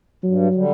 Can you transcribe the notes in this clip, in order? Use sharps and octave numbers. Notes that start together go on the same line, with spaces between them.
G2 F#3
D3 G3